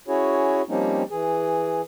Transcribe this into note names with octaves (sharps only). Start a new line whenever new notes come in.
C#4 E4 F#4 G#4 C#5
F3 G3 A#3 C4 C#4 D#4
E3 G#4